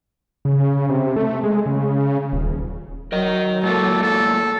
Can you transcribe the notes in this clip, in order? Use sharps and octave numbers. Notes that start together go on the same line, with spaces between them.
C#3
C3
A3
G#3
C#3
D#1
F#3 A#4 D#5
G#2 A3 A#3 A4
A4